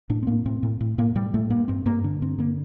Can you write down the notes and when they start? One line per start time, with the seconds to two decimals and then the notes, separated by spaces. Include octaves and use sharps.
0.10 A2 D4
0.23 C4
0.27 A2 A#3
0.45 A2 C4
0.63 A2
0.81 A2
0.98 A2 A#3
1.15 A2 G3
1.34 A2 A3
1.50 G2 A#3
1.68 G2 C4
1.86 G2 A#3
2.04 D3 D4
2.22 G2 C4
2.38 D3 A#3